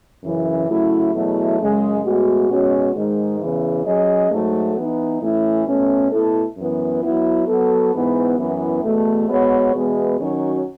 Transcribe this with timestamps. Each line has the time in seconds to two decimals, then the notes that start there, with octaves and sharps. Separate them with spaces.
0.22 F#2 C#3 E3
0.67 C#3 F#3 A3 E4
1.13 E2 B2 F#3 A3 E4
1.58 F#2 C#3 G#3
2.03 A2 G#3 B3 F#4
2.49 B2 G#3 C#4 F#4 C#5
2.94 G#2 D#3 G#3
3.40 E2 C#3 E3
3.84 F#3 C#4 G#4 D#5
4.30 G#2 F#3 A3
4.75 E3 B3 D#4
5.20 A2 E3 A3 C#4 E4
5.66 B2 A3 C#4
6.11 B2 A3 E4 A4
6.56 F#2 E3 B3
7.02 F#3 B3 E4
7.47 F#3 B3 F#4 A4
7.92 G#2 E3 B3
8.37 F#2 E3 B3 E4
8.83 E2 B2 A3
9.28 G#3 B3 F#4 C#5
9.74 E2 B2 G#3 B3
10.19 D#3 F#3 C#4 F#4 C#5